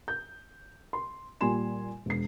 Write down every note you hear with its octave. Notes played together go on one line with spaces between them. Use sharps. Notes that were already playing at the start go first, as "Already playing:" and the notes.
G6
C6
A#2 G3 G#5 C6 E7
E1 C7